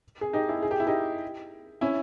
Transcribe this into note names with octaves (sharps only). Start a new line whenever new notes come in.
G#4
D#4 G4
E4 G#4
G#4
G4
E4
D#4 G4
C#4 E4